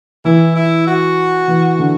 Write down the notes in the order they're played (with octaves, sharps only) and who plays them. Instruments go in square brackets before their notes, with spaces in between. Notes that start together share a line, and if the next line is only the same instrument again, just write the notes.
[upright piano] E3 [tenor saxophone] E4
[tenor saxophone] E4
F#4
[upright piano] E3
D3